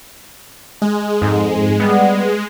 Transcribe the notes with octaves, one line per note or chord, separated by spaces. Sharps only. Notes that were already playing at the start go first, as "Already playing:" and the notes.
G#3
F2 G#2
G3 B3